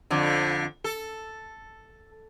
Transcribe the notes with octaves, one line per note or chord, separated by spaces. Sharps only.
F2 D3
A4